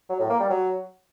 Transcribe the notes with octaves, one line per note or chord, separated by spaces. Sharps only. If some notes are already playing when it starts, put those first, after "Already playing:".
F#3
A2
A#3
G3
F#3